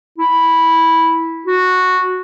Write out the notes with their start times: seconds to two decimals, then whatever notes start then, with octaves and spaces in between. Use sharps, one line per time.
0.18 E4
1.46 F#4